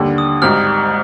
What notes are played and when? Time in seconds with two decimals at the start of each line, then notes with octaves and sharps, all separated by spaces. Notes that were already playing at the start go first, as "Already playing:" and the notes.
Already playing: D#2 D3 G3
0.18 D#6
0.42 G#1 G#2 G3 F6